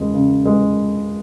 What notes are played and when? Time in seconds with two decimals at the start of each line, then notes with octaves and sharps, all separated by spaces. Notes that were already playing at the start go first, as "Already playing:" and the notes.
Already playing: E1 C#3 G#3
0.14 C#3
0.45 G#3